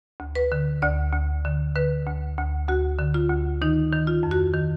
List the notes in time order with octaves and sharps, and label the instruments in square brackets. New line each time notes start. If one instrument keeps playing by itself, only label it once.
[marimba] D2
B4
D3
D2 D5
D2
D3
D3 B4
D2
D2
D2 F#4
D3
F4
D2
D#3 D#4
D#3
F4
F2
F#4
D#3